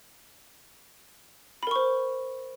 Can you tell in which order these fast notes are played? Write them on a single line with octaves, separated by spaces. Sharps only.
B5 A#4 C#6 C5